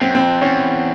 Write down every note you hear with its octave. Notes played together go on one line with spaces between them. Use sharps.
F#2 C4
C4
F2
E2 C#4